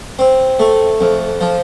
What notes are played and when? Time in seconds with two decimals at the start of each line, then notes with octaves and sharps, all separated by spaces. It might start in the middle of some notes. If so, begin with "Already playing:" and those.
0.19 C4
0.59 A3
1.01 F2
1.41 F3